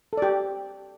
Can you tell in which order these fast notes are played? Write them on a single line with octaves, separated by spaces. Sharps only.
A4 D5 G4